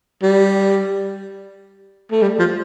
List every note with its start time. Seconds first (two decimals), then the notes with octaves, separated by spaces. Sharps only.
0.23 G3
2.12 A3
2.22 G3
2.39 F3